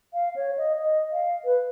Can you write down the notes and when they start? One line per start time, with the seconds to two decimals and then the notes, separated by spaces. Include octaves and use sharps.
0.14 F5
0.36 C#5
0.57 D#5
0.78 D#5
1.12 F5
1.45 B4